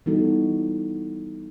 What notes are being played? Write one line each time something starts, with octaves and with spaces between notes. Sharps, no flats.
E3 G3 B3 D#4 F#4 A4